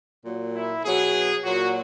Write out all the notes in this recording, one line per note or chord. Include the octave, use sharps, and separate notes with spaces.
A#2 F#3
E4
B2 F#3 G#4
A#2 F#3 F#4